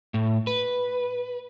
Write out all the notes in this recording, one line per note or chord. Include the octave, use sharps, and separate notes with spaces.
A2
B4